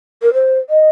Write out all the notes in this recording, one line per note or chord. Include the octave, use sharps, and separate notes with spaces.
A#4
C5
D#5